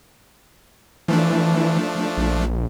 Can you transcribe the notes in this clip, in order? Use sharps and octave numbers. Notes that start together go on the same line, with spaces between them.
E3 F3 A3 D4
A#1